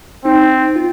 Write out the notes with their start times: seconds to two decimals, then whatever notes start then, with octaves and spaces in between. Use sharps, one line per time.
0.25 C4 D#4
0.76 F4